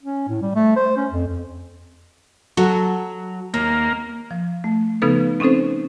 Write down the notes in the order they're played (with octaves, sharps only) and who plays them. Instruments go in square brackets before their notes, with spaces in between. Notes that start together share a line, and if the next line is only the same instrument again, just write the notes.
[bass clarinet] C#4
A2
G3
A3
C5
C#4
F2
F2
[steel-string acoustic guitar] F#3 [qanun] F#4 A4
[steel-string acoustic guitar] D#2 [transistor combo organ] A#3
[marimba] F3
A3
C#3 F3 B3 D#4 A4 B4
C4 C#4 D#4 A4 C5